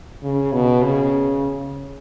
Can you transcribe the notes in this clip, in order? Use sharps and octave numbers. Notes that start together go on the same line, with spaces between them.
C#3
B2
C#3